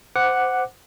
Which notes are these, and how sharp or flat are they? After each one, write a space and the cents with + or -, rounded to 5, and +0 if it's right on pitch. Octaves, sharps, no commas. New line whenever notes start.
C5 -15 F#5 +0 D6 +0